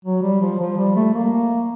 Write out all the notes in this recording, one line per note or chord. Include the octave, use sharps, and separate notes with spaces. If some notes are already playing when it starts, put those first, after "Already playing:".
F#3
G3
F3
F3
G3
A3
A#3